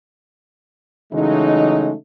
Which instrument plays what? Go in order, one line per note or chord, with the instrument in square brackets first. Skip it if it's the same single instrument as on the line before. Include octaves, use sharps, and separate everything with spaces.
[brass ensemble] C#3 E3 F#3 G#3 A3 D#4